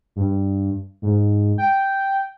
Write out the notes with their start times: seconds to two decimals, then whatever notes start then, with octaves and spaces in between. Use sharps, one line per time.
0.16 G2
1.02 G#2
1.58 G5